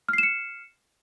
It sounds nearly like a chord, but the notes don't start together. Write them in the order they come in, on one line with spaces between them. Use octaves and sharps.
F6 C7 E7 C#7